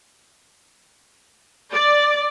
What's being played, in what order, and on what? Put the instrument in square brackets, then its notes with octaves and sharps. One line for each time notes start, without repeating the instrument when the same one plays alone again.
[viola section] D5